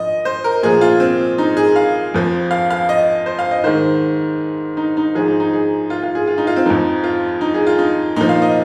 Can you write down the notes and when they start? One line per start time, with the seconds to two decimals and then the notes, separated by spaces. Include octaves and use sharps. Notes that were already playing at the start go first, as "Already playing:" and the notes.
Already playing: F3 D#5
0.25 C5
0.44 A#4
0.63 A#2 F3 G#4
0.81 F4
1.00 C4
1.38 D#4
1.57 G#4
1.76 F5
2.14 F2 F3
2.51 F5
2.70 F5
2.89 D#5
3.26 C5
3.39 F5
3.51 D#5
3.64 G#2 D#3 C5
4.77 D#4
4.97 D#4
5.15 G#2 F3 G#4
5.27 D#4
5.40 D#4
5.53 G#4
5.90 F4
6.03 F4
6.15 G#4
6.27 F4
6.38 D#4
6.47 F4
6.56 C4
6.66 F2 F3 D#4
7.04 F4
7.41 D#4
7.54 G#4
7.67 F4
7.79 D#4
8.16 A#2 F3 D#4
8.29 F5
8.42 D#5